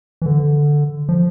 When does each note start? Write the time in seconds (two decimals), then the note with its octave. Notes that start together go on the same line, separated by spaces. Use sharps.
0.22 E3
0.26 D3
1.09 F3